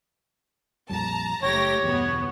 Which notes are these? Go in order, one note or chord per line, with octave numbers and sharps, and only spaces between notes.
A#1 F2 G3 A5 A#5
F#1 A3 G4 C#5 A#6
G1 E2 B2 B3